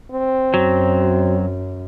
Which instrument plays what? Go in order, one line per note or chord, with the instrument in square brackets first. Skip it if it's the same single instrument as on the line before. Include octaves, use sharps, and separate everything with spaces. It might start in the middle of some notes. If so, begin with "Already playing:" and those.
[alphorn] C4
[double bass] F#2 [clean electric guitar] F#3